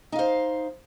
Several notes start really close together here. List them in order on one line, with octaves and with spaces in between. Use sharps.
D#4 F5 C5